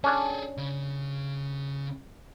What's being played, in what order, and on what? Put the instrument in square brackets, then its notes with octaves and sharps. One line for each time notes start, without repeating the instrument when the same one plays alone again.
[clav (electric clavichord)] C#4 D4 [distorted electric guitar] G#4 A4
[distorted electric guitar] C#3